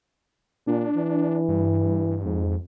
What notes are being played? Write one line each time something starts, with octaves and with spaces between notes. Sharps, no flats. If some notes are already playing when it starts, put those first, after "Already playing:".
A#2 D4
E3
G2
F2 G#2